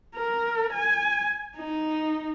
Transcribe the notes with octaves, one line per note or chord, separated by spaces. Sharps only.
A#4
G#5
D#4